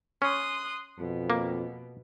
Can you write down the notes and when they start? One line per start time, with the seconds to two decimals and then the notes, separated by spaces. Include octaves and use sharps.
0.22 C#4 C6 D#6 F#6
0.99 F2 B2
1.30 A#3